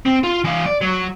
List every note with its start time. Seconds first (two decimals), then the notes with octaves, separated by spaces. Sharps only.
0.05 C4
0.23 F4
0.44 E3 F5
0.66 D5
0.81 F#3